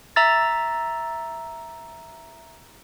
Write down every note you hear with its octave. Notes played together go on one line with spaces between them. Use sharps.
E5 A#5 E6 A6